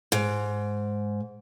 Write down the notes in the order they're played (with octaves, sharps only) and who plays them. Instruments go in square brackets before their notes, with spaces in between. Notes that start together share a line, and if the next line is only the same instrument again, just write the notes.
[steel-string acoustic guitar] G#2